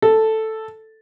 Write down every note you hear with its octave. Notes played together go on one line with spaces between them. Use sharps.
A4